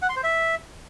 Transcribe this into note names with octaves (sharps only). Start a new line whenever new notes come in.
F#5
C6
C5
E5